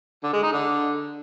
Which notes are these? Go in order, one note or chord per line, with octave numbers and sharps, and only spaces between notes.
D3
G#3
D#4
D3